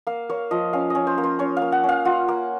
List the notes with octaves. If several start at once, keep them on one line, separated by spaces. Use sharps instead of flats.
A#3 F5
A#3 C#5
F3 D#5
C#4 F5
C#4 D#5
C5
A#3
C5
C#4 C#5
F5
A#3
F#5
C#4
F5
F4 F#5
A#3